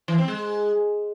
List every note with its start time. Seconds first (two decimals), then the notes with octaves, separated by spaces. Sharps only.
0.08 E3
0.18 C4
0.28 G#3